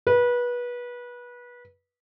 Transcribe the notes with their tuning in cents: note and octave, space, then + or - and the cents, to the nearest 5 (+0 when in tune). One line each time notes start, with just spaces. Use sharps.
B4 -25